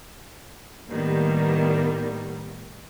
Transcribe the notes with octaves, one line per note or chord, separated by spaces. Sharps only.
A2 D#3 G3 A#3 B3